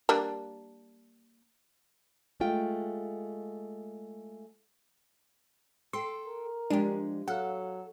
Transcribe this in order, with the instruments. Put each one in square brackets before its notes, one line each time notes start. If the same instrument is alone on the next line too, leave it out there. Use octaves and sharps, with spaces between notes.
[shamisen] G3 A#3 D4
[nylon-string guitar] G#3 A3 F4 G5
[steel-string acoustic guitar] A4 G5 [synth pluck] C6
[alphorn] A#4
[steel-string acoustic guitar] F3 G#3 [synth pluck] D4 G4
[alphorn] F#3 [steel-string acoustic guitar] A4 [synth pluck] F5 F#5